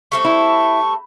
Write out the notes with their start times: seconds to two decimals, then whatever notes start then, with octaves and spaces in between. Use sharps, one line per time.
0.12 G3 A3 C4 C#6
0.25 E4